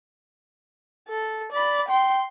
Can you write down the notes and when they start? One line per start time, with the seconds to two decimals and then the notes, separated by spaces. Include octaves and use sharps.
1.08 A4
1.52 D5 B5
1.88 G5 C6